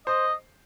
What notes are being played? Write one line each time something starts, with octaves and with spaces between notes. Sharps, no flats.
C5 D#5